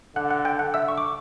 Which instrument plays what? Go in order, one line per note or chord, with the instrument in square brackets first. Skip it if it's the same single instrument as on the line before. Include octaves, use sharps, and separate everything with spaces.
[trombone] D3 [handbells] F#5 F#6
[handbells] F#5 F#6
G5 G6
[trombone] D3 [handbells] F#5 F#6
[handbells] E5 E6
C#6
D6